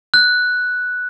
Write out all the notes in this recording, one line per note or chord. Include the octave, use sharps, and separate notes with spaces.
F#6